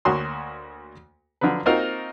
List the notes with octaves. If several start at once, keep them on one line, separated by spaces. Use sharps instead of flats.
D2 A#3 F#4 C#5 C6 D#6
D3 F3 F#3 B4
A#3 C4 D#4 F4 F#4 A#4